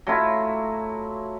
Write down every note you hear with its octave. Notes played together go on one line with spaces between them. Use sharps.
F#3 A3 E4 F4